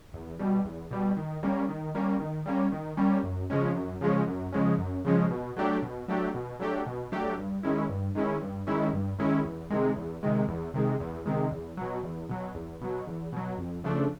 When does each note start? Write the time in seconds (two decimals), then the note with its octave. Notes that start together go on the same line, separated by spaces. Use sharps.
0.14 E2
0.39 B2 G3
0.65 E2
0.91 B2 G3
1.17 D#3
1.43 G3 A#3 C#4
1.68 D#3
1.95 G3 A#3 C#4
2.20 D#3
2.46 G3 A#3 C#4
2.72 D#3
2.97 G3 A#3 C#4
3.24 F#2
3.50 C#3 F3 G#3 C#4
3.75 F#2
4.01 C#3 F3 G#3 C#4
4.27 F#2
4.52 C#3 F3 G#3 C#4
4.78 F#2
5.05 C#3 F3 G#3 C#4
5.31 B2
5.57 F#3 A3 D4 G4
5.82 B2
6.08 F#3 A3 D4 G4
6.34 B2
6.60 F#3 A3 D4 G4
6.86 B2
7.12 F#3 A3 D4 G4
7.37 G2
7.63 D#3 G#3 C#4 E4
7.89 G2
8.15 D#3 G#3 C#4 E4
8.41 G2
8.67 D#3 G#3 C#4 E4
8.93 G2
9.19 D#3 G#3 C#4 E4
9.45 E2
9.70 C3 D#3 G#3
9.96 E2
10.23 C3 D#3 G#3
10.48 E2
10.74 C3 D#3 G#3
11.00 E2
11.26 C3 D#3 G#3
11.51 E2
11.77 B2 F#3
12.03 E2
12.29 B2 F#3
12.55 E2
12.81 B2 F#3
13.07 E2
13.32 B2 F#3
13.58 F2
13.84 C#3 F3 A3 D4